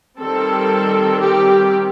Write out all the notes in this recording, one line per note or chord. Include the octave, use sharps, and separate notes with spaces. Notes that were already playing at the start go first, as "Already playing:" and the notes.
D#3 G3 C4 A4
G4